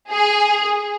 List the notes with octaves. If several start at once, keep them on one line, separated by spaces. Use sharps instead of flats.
G#4